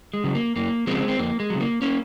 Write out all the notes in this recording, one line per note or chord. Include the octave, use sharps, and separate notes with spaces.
G#3
C#3 F#3
A#3
F#2 A#3
C#3 F3 G#3 C4
C4
F2 A#3
G#3
C#3 F#3
A#3
A#3 C#4